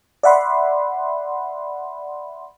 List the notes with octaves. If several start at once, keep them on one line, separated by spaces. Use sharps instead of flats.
D5 E5 F#5 B5 C6